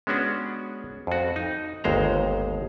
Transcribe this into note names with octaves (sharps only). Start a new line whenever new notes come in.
G#3 B3 C#4 D4 F#4
F2 F#4
D#4
G1 D#2 G#3 C5 A#5